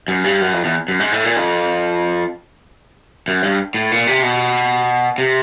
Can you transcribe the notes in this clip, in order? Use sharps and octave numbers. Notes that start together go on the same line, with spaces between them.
F#2
G2
F#2
F2
E2
F#2
G#2
A2
A#2
F2
F#2
G2
A2
A#2
C3
B2
C3